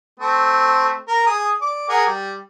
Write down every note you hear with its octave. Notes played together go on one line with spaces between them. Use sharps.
A3 C4
A#4
G#4 D#6
D5
G#4 A#4 F#5
G3